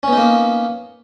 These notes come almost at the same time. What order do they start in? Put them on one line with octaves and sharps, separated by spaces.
C#4 B3 D#4 A#3